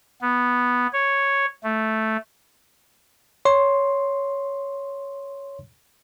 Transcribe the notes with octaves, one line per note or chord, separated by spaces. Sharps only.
B3
C#5
A3
C#5 C6